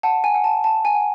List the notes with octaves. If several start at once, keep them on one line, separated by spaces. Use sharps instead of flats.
F#5 A5
G#5
F#5
A5
F#5 A5
G#5
F#5